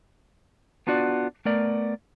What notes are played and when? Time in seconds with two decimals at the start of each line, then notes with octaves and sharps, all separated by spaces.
0.87 B3 D4 F4 F#4 D5
1.45 A3 B3 A#4 D5